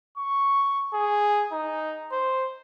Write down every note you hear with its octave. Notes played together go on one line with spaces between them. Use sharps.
C#6
G#4
D#4
C5